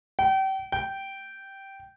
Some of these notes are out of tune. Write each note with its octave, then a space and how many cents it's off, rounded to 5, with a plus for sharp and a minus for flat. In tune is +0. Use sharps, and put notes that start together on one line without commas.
G5 -35
G5 -10